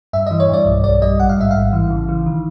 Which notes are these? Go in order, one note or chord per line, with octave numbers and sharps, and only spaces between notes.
G2 E5
E3 D#5
C#5
G2 D5
B1
B1 D5
G3 D#5
A1 F#5
F5
G#2 E5
A1 F5
E3
C#3
E3
D#3